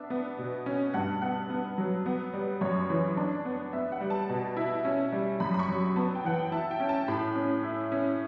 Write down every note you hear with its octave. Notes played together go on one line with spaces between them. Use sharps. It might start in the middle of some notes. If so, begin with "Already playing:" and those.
Already playing: B3 D4 E5
B3
B2
C#4
G2 F#5
B3 F#5
B3
F#3
B3
G3
F#2 C#5
E3
D4
B3
B3 E5
F#5
G3
A5
B2 A5
E4
C#4
G3
F#2 B5
B5
C#6
F#3
B3 A5
G5
E3 F#5
G5
E4 A5
G5
C#4
A5
A2 B5
C#4
E4
C#4